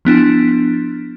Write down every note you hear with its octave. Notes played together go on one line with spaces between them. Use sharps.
F3 B3 D4 E4